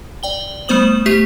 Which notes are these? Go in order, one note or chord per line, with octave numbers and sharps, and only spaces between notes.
D5 G5 G7
G3 A3 B3 C5 D#6 F#7
A3 G4 E5 B6 C7